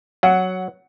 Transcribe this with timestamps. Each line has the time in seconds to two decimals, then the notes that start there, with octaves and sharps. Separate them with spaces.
0.23 F#3 F#5